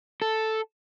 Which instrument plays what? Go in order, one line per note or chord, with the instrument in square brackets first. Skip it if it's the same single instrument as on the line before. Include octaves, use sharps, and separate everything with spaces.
[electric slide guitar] A4